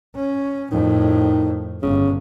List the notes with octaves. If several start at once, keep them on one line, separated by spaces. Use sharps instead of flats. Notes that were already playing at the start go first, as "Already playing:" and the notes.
C#4
F2 A2 D#3
G1 C#3